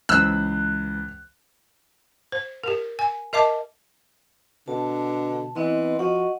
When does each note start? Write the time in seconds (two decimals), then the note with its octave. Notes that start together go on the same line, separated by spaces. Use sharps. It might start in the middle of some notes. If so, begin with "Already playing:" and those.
0.09 C#2 E3 C5 E6 F#6
2.32 C5
2.64 G4 A#4
2.99 G#5
3.33 A#4 D#5 E5 A5 D6
4.68 B2 D3 A5
5.56 E3 B3 C4 D#5 C6
5.99 F3 F#4 D#5 F#5